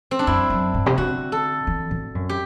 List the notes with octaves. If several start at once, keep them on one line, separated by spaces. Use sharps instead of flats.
C4
D4
F#2 E4
F#2
G2
C3
D3 F#4
A4
E3
A2
F#2
G4